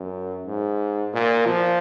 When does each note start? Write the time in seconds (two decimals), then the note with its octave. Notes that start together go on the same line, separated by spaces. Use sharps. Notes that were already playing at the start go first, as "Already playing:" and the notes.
Already playing: F#2
0.46 G#2
1.13 A#2
1.47 F3